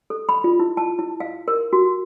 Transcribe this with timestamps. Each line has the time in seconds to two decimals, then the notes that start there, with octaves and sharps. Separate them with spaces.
0.10 A4
0.29 B5
0.44 F4
0.59 E4
0.77 A5
0.99 E4
1.20 F5
1.48 A#4
1.73 F#4